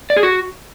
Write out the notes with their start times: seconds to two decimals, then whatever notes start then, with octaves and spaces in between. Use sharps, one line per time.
0.10 D5
0.16 G#4
0.23 F#4